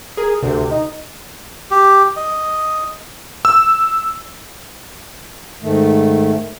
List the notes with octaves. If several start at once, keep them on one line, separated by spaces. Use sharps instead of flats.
G#4 A#4
D2 C3
D#4
G4
D#5
E6
G#2 D#3 A3